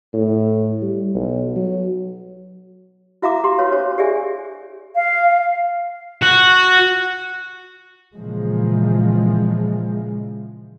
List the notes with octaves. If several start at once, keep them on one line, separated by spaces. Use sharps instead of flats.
A2
G3
B1
F#3
E4 F#4 E5 F5 A#5 D6
G4 C6
F#4 B4 C#5 F5
D4 C5 C#5
G4 G#4 D5 E5 G#5
F5
F#4
A#2 C#3 E3 F3 G#3